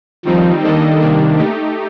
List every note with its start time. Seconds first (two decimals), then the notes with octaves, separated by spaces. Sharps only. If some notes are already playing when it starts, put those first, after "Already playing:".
0.25 D#3 F3 G3 C4 D#4
0.62 D#3 G3 A#3 D4 A4 D#5
1.00 C3 G3 A#3 D4
1.38 A3 D#4 G4